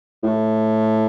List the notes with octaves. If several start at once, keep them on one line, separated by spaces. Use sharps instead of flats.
A2